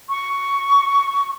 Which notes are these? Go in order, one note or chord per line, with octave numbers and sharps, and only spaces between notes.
C#6